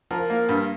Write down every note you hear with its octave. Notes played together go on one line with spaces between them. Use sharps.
F3 A#4
A#3
G2